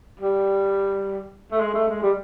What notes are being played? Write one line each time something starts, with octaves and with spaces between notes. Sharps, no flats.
G3
A3
G#3
A3
G#3
G3